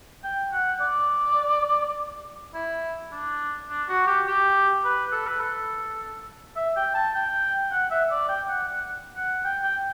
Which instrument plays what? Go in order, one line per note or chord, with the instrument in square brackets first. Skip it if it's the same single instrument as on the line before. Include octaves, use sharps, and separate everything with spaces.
[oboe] G5
F#5
D5
E4
D4
D4
F#4
G4
G4
B4
A4
B4
A4
E5
G5
A5
G5
F#5
E5
D5
G5
F#5
F#5
F#5
G5
G5